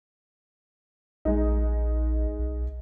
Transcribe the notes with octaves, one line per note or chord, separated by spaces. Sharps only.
A#1 G#3 D#4
B1